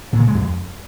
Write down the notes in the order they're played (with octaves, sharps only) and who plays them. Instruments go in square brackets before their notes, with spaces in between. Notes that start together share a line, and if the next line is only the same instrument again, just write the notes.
[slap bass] A#2
C#3
G#3
F2